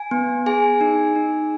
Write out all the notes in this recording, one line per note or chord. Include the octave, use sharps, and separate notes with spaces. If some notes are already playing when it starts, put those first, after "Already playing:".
Already playing: G#5
B3
G#4 G#5
D#4
D#4